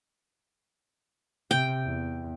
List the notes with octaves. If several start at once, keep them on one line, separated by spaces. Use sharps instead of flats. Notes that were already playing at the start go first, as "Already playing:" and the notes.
C3 G5
E2